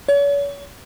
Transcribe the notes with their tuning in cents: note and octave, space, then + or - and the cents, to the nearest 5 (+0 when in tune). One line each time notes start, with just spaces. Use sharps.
C#5 +40